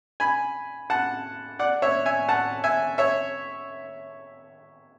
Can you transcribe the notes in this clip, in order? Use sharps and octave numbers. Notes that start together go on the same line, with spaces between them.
G#5 B5
F#5 A5
D5 F#5
C#5 E5
E5 G#5
F#5 A5
E5 G#5
C#5 E5